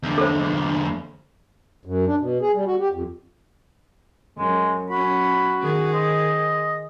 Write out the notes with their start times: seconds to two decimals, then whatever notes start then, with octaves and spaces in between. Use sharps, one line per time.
0.03 E2 D3
0.18 A4 C5
1.85 F#2
2.07 D4
2.20 B2
2.42 G#4
2.54 G3
2.67 F#4
2.80 G4
2.92 F2
4.38 F#2 G#3
4.90 F#3 C#4 F#4 B5
5.62 D#3 G#4
5.93 C5 D#5